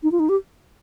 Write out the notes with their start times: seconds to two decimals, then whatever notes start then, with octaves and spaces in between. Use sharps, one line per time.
0.03 D#4
0.12 F4
0.20 D#4
0.29 G4